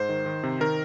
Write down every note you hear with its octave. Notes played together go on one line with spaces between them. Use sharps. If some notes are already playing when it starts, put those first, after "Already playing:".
Already playing: G#2 C5
D#3
D#3
C3
D#3 A#4